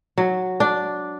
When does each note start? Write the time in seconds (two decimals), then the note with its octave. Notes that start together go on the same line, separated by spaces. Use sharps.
0.18 F#3
0.60 D4